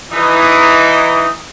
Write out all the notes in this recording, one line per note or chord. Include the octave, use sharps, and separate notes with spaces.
E3 D#4